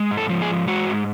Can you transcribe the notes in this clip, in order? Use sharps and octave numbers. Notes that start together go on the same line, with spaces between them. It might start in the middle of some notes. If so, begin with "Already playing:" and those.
Already playing: G#3
G#2
A4
F3
G#4
G#2
G#3 F#4
G#2